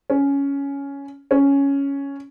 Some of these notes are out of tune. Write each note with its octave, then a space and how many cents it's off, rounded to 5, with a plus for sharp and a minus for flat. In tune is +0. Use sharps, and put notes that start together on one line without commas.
C#4 +10
C#4 +5